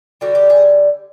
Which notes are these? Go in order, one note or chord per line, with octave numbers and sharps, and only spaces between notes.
D3 G3 F#4
G4
G#4